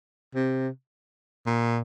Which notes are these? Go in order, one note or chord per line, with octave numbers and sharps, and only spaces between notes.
C3
A#2